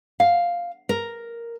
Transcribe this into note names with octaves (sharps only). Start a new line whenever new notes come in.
F5
A#4